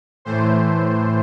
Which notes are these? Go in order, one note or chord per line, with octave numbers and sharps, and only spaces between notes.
A2 E3 A3 C5